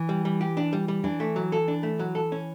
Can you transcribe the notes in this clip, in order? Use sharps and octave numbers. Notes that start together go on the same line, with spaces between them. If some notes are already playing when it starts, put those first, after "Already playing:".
Already playing: E3
G3
G3
G4
D4
G3
G3
E3 D4
A3
F#3
A4
D4
A3
F#3
A4
C#4